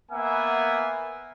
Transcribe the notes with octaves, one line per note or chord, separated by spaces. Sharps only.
A#3 B3 E5 F#5 G#5